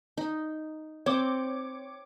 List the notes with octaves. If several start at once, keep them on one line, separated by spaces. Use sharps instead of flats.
D#4
C4 C#5 D6